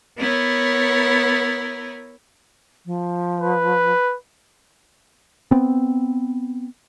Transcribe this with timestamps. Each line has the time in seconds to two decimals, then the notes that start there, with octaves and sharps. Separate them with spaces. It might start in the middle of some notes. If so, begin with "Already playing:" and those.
0.18 B3 E4 A#4 C#5
2.86 F3
3.40 B4
5.51 B3 C4